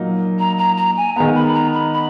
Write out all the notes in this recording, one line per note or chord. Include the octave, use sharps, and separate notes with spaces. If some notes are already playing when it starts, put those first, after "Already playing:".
Already playing: A#2 F#3 A#3 D#4
A#5
A#5
A#5
G#5
D#3 G#3 B3 A#5
B5
A#5
B5
B5